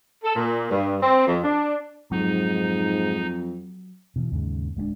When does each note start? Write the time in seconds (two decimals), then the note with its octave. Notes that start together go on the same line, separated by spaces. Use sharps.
0.24 A4
0.36 A#2
0.70 G2
1.03 C4
1.27 F2
1.44 D4
2.12 F2 G#2 F#3 D#4
4.16 B2 E3
4.32 D#2 G#2 C#3
4.76 D1 G#3 B3 D4